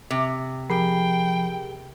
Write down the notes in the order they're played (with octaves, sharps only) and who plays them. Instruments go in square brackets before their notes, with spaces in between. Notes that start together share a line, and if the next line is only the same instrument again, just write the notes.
[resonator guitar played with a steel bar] C3
[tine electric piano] F3 B5 C7 [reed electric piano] G4 G#4 A#4 [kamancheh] G5